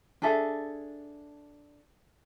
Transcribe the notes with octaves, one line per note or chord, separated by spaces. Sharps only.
D4 G#4 A4 E5